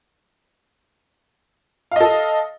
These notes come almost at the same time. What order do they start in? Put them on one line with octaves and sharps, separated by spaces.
F5 D#5 A4